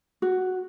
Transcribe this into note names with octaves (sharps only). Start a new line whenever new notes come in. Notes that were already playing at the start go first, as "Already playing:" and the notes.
F#4